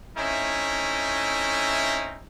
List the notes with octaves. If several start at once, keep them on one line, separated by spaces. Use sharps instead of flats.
A3 C4 C#4 D#4 E4